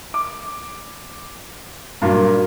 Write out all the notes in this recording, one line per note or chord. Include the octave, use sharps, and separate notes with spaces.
D6
G2 A#2 F#3